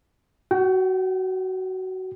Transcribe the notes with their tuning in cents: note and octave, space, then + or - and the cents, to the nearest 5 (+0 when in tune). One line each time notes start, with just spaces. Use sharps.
F#4 +15 G5 -30